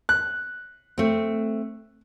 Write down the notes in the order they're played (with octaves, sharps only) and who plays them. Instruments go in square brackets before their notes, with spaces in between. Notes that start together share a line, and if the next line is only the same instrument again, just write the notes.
[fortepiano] F#6
[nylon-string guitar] A3 C4